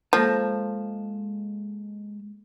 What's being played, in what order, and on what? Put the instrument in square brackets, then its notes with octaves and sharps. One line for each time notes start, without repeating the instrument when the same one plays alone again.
[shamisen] F3 [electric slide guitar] G#3 A5 [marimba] A#3 A4 A#6